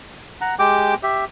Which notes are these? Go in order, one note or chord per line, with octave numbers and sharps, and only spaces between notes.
F#5 A#5
G#3 G4 G5 D6
G4 E5